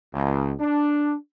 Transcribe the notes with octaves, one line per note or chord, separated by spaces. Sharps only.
C#2
D4